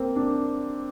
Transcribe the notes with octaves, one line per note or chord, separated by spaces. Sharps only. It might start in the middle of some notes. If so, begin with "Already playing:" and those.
Already playing: A#3 C4
D4